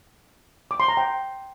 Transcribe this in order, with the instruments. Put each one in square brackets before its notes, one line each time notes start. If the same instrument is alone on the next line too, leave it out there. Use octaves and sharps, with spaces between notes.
[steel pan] D6
C6
A#5
G5